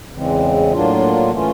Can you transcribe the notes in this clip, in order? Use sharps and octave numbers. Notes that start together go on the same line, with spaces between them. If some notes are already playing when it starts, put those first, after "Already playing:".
E2 C#3 E3 G#3 C4
A2 F#3 A#3 D4 F4
E3 A3 C#4 F4